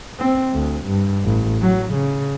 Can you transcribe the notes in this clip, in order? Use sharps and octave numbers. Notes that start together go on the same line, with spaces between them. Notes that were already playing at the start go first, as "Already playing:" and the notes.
C4
D2
G2
A1
F#3
C#3